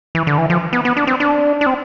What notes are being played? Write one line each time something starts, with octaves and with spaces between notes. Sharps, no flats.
E3
D3
E3
F3
B3
B3
D4
C4
D4
D4
C4